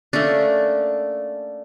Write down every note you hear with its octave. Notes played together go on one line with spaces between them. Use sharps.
A3 A#3 C#4 D4